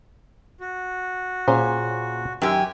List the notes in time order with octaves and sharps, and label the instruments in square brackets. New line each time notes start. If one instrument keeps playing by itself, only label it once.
[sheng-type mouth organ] F#4
[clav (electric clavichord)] A#2 [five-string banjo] C#4 G#4 C5
[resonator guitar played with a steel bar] F#2 G4 [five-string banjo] D#3 [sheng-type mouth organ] G#5